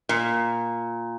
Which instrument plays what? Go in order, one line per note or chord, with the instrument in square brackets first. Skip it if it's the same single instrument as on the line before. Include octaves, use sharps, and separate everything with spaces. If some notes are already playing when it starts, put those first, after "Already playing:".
[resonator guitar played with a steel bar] A#2